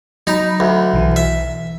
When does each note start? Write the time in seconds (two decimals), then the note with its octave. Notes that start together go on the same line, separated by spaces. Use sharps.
0.27 F#3 D#4 A#5 B5
0.60 D2
0.94 B1 E3
1.16 E5